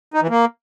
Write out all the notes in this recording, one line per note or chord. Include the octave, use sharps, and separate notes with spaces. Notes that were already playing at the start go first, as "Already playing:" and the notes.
D#4
E3
A#3